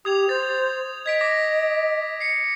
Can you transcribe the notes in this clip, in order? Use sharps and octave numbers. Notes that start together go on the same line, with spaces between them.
G4 D#6 G#6 F7
C5 A6
D#5 G#6 B6 D7
D6 A#6
C7 C#7